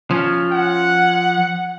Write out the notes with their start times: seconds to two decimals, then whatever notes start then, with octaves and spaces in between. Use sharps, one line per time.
0.11 F3 C#4
0.51 F#5